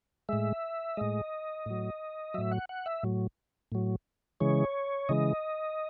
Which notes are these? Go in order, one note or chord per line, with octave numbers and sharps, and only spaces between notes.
A2 G#3 E5
A2 G#3 D#5
A2 F#3
A2 F#3 E5
F#5
F#5
E5
A2 F#3
A2 F#3
C#3 E3 G#3 C#5
C#3 E3 G#3 D#5